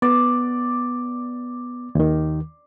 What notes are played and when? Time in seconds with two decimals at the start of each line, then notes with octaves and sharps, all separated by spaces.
0.02 B3 D5
1.95 D#2 D#3